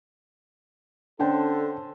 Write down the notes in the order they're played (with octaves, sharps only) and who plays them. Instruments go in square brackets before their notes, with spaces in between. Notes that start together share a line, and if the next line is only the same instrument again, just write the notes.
[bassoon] D3 [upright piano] C#4 C5 A5 [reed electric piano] D4 G5 [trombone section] A4